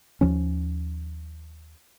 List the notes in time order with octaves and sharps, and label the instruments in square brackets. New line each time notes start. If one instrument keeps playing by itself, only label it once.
[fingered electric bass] D#2 F3 C#4